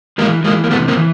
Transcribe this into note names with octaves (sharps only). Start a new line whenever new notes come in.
E3 G#3 A#3
E3 G#3 A#3
A#3
C3 A3 B3
A#3 C4
E3